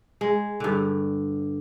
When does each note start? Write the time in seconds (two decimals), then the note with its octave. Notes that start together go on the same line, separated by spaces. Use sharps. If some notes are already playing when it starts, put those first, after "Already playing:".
0.21 G#3
0.60 G2 D3